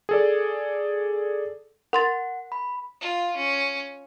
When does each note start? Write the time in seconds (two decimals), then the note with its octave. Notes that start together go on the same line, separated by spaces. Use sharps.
0.09 G#4 A4 D5
1.93 A#4 F#5 C6 A6
2.52 B5
3.01 F4
3.36 C#4